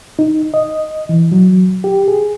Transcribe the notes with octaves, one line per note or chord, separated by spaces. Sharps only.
D#4
D#5
E3
F#3
G4
G#4